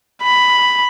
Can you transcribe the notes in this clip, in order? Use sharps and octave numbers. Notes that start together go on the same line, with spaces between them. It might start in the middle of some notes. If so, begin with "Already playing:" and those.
B5